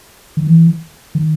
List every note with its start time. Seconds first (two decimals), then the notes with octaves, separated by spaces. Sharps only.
0.37 D#3
0.47 E3
1.15 D#3